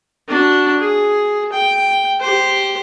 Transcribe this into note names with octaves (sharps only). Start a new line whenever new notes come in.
D4 F#4
G#4
G5
G4 C5